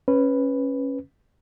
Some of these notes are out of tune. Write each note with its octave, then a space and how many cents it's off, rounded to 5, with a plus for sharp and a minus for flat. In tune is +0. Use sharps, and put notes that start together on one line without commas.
C#4 -15 B4 +0